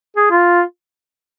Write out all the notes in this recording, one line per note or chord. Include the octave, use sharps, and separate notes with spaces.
G#4
F4